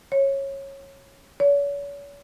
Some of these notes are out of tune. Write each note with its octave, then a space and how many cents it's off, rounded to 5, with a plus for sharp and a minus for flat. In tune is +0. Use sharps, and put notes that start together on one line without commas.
C#5 -15
C#5 +40